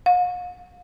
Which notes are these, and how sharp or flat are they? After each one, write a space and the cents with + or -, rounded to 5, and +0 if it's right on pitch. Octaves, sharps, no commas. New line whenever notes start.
F5 +45